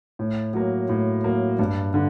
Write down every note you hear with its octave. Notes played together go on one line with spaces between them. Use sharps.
A2
F#3 A#3
A2
F#3 A#3
G2
D3